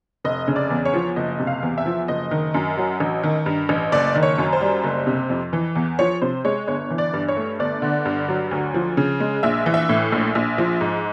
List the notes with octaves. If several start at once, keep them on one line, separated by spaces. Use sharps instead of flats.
F1 D#5
C#3
D5
E2
C#5
F3
F#1 D#5
C3
F5
E2
E5
F3
F#1 D#5
D#3
F#2
F#3
A1
D#3
G2
A1
F#1 D5
D#3
C#5
F#2
C5
G3
F#1
C3
F2
E3
E2
F3 C#5
C3 C5
G#3 C#5
G1 C#5
E3
D5
G2
C#5
A3
G1 D5
D3
G2
F#3
D2
F3
C#3
G#3
A#1 E5
E3
E5
A2
A#1
A#1
F3
G#2